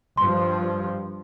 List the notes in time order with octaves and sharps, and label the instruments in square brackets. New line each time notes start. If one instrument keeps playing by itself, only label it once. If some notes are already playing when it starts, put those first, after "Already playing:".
[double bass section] G2 F3 [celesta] C6